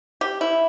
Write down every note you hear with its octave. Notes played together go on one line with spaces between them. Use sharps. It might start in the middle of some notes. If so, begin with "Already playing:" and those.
G4
E4